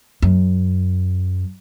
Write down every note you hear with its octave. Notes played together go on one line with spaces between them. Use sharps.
F#2